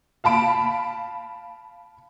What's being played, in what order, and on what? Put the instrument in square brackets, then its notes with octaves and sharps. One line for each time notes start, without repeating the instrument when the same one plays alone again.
[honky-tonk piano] F5 A5 B5 D7